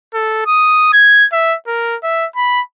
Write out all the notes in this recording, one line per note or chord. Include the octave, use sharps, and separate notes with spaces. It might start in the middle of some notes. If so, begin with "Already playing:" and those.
A4
D#6
G#6
E5
A#4
E5
B5